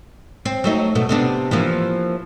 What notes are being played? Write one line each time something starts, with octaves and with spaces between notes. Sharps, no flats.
C4
F#3 A3 D#4
B2 A3
C3 B3 D4
E3 F3 A#3